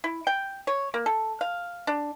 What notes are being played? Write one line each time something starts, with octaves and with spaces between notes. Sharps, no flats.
E4
G5
C#5
A#3
A4
F5
D4